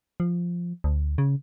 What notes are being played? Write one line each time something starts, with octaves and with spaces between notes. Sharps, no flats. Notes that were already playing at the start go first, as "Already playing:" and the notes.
F3
D2
C#3